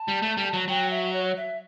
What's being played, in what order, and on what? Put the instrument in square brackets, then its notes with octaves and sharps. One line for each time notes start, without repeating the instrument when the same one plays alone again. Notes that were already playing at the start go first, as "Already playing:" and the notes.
Already playing: [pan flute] A5
[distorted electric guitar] G3
A3
G3
F#3
[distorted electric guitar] F#3 [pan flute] G5
[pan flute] E5
C#5
E5